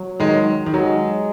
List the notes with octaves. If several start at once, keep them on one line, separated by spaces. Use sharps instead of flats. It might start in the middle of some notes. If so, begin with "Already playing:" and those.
Already playing: F#3
D#3 G#3
D#3
F#3 G#3